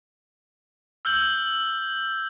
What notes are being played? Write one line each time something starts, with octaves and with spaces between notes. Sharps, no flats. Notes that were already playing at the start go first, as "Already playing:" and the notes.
E6 F6 G6 F#7